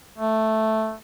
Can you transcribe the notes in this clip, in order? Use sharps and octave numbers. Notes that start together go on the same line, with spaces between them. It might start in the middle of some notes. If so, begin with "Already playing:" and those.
A3